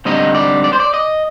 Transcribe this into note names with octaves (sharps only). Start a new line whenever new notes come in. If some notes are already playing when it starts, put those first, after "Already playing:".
D3 G3 C4 D#4 D#5
D5
D5
C5
D5
D#5